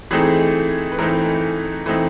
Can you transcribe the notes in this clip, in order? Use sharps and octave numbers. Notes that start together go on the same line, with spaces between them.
E3 A3 C4 D#4 G#4
B4
E3 A3 C4 D#4 A#4
E3 A3 C4 D#4